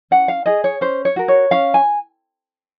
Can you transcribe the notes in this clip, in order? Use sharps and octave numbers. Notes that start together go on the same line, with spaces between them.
C#4 F#5
F5
G#4 D#5
C#5
C#4 C5
C#5
F#4 A#4
C#5
C#4 F5
G#5